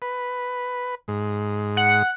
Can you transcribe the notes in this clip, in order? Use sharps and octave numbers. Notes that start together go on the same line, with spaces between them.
B4
G#2
F#5